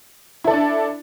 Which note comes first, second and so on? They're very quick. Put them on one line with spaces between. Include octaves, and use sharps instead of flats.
E4 A4 D5 D4